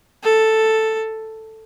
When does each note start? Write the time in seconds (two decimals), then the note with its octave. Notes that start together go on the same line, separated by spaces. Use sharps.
0.24 A4